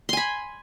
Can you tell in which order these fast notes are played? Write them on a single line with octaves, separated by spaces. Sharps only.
C6 G#5 B5